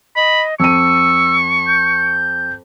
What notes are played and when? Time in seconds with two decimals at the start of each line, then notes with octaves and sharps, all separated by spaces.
0.16 D#5 B5
0.60 F2 C#6 E6 D#7
1.67 G6